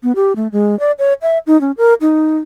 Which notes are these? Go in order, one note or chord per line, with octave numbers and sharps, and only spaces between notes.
B3
G4
A3
G#3
D5
C#5
E5
D#4
C#4
A#4
D#4